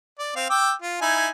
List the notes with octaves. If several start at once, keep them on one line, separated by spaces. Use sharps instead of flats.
D5
C4 F5
G5 D6 E6
F4
D#4 E4 G#5